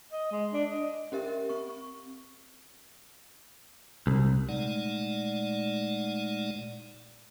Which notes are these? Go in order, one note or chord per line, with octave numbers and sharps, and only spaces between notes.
D#5
G#3
D4
D#5
C#4 G4 A#4 E5
C4 C#6
C2
A#2 G#3 A3 D#4 D5 F#5